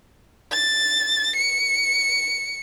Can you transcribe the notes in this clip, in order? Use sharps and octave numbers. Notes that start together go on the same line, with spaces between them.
A6
C#7